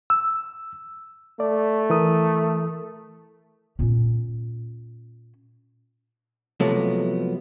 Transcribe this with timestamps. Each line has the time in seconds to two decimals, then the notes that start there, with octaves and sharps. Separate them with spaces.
0.10 E6
1.40 A3 D5
1.90 E3 A#4 D#6
3.79 A#2 C#4
6.60 C3 F3 F#3 G#3 A3 B3